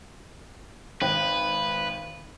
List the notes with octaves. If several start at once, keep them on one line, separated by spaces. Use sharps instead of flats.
G#1 B4 G5